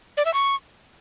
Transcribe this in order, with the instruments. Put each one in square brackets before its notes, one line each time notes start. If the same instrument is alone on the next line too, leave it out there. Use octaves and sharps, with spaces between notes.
[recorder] D5
E5
C#6